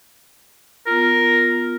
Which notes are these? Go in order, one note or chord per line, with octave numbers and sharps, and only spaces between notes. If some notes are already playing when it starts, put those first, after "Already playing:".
B3 F4 A#4